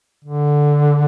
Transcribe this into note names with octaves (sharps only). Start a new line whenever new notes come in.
D3